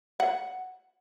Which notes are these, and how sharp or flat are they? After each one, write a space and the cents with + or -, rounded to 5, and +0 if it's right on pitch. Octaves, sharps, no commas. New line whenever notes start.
F#5 +0